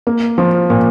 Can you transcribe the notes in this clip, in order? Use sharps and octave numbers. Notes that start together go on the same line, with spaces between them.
A#3
F3
A#2